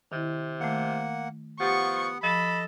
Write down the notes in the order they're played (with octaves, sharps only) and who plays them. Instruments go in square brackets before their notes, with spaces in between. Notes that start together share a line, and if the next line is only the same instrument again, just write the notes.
[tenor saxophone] C3 [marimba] D#3 E4
[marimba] D#3 A3 [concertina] A#3 F#5
[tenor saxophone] F3 [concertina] B3 F#5 [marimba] G4 A6 [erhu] C#6
[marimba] F3 [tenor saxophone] A4 [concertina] D#5 [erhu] B5